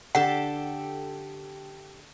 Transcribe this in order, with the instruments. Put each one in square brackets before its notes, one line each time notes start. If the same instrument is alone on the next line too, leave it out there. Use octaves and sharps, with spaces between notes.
[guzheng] D3 [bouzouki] G4 A4 [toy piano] F#5